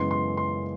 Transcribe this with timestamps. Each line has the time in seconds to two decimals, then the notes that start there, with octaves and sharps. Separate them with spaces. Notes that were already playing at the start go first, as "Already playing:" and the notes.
Already playing: F#2 C#3 E3 G#3 B3 C6
0.11 C6
0.37 C6